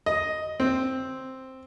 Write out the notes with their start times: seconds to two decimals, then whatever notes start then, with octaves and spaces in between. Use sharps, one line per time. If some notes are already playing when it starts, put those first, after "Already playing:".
0.06 D#5
0.60 C4